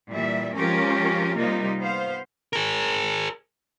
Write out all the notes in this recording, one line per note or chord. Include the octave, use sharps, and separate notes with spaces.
A#2 E3 G3 E5
F3 G#3 C#4 F4 G4 A#4
C3 G3 A#3 D#4 F4
B3 C5 F5
G#4 A#4